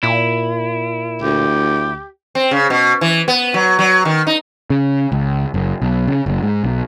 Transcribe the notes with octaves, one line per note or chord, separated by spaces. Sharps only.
A#2 E4
D2 G4
C4
C#3
B2
E3
B3
F#3
F#3
D#3
D#4
C#3
C#2
F#1
B1
C#3
F#1
G#2
B1